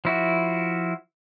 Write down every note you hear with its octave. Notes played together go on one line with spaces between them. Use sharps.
F3 E4 F#4